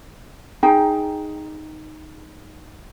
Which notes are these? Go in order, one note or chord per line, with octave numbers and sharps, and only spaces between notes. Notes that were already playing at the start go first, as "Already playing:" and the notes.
D#4 G#4 G5 A#5